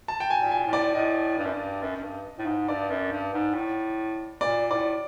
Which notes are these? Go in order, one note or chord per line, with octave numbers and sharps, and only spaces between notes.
A5
G5
G#5
A#2
G#5
A2
D5
A2 D#5
G2
F#2
G2
F#2
F#2
G2
A2
G#2
G2 D5
F#2
G2
G#2
A2
A#2 D5
A2 D5